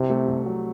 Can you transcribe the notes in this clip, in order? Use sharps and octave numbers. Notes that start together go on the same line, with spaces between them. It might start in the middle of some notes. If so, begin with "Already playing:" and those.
Already playing: C2 C3
A3
C2
F#3